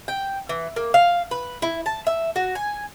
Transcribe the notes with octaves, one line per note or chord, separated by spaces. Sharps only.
G5
E3
A#3
F5
B4
E4
A5
E5
F#4
G#5